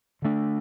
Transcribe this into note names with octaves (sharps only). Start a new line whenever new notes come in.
D3 A3 D4